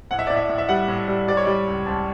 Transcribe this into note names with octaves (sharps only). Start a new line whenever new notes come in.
A2 F#5
E5
A2 D5
E5
A2
E5
G3 F#5
A2
G3
G3 D5
C#5
G3 D5
C#2
C#2 A5